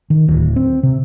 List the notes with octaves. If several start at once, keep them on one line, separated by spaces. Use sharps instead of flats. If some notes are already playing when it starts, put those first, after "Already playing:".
D#3
D1
C4
C3